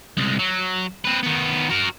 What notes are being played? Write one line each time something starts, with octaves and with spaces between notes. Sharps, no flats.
C2 G#3
F#3
C4 B4
D#3 B3
F#4 A#4